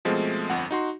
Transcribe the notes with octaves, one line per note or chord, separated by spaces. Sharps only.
B2 F3 G#3 A3 C4
G1 F2 F#5
D#4 F#4 C6